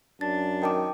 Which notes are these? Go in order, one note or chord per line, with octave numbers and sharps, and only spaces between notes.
F#2 D4 A6
D#3 G5 A5 D6